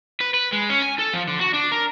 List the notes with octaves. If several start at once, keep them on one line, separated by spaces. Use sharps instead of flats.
B4
B4
G#3
C#4
G#5
A4
F3
D3
F#4
D4
A#4